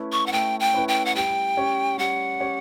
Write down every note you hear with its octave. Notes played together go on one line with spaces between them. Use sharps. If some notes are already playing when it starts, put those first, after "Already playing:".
Already playing: A3 C#4 E4 B4
C#6
F#5
A3 G5
G5
C#4 E4 B4
G5
F#5
G3 G5
C#4 G4 C#5
G3 F#5
C#4 G4 C#5